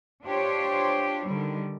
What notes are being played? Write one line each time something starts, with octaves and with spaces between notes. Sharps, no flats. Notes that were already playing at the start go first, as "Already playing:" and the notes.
D4 F4 G4 C5 C#5
D3 D#3 G3